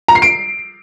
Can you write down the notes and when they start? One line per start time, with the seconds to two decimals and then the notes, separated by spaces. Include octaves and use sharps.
0.08 A#5
0.15 C7
0.22 D7